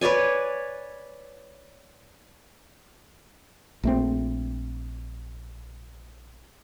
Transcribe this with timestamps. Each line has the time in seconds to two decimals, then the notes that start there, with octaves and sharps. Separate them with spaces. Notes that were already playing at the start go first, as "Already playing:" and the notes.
0.01 B4 C#5 D5 G#5
3.83 A#1 A3 C4